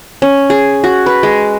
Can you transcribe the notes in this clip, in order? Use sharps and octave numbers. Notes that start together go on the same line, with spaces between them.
C#4
G#4
F#4
B4
G#3